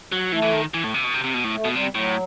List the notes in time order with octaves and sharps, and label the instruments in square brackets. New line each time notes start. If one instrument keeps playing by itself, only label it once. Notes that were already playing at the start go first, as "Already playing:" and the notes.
[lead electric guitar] F#3
[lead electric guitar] E3 [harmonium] A3
[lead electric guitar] E3
D#3
E3
A2
C3
B2
C3
C3
B2
A2
[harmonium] A3
[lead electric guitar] B2
[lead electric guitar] C3 [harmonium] G3
[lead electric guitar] A2 [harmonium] F#3